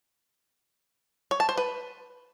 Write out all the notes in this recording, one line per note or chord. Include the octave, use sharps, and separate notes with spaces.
C#5
A5
C5
B4